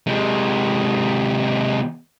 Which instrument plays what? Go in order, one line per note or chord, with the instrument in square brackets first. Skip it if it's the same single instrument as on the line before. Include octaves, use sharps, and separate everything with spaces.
[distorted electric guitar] C3 G#3